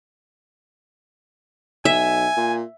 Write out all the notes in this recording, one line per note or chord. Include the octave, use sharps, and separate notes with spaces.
B1 E5 G#5
A#2